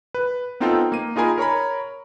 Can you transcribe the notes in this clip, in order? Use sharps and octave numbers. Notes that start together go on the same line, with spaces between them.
B4
B3 C4 D#4 F4 A4 G5
A#3 D#7
D#4 F4 G#4 A#4 G#5 B5
A#4 C#5 A#5 B5